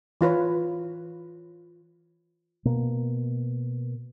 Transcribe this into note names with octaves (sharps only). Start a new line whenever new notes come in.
E3 F4 B4 C#5
B2 A#3